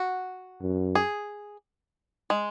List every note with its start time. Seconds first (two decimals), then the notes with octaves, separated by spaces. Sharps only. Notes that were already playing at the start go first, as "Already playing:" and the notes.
Already playing: F#4
0.61 F#2
0.95 G#4
2.30 G#3